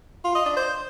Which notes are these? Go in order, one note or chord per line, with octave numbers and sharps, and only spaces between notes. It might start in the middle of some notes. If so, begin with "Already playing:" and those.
F4
D#5
D4
C5